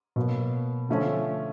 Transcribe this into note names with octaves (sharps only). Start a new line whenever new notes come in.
B2 F#3 A#3
D3 F3 A3 C#4